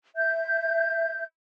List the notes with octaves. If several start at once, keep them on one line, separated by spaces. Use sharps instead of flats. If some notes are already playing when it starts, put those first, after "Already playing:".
E5 G6